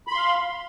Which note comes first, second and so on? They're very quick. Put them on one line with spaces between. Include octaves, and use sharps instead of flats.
B5 C6 F5